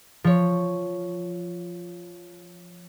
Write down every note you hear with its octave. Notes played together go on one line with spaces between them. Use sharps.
F3 C#5